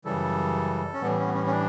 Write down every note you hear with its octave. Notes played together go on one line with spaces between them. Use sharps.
F#2 C#3 E3 G3 A4
C#4
A2 E3 G3 B3
C#4
B3
C#4
C#4
D4